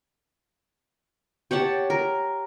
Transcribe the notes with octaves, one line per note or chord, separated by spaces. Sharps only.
G4 C#5 F#5 A5
A#4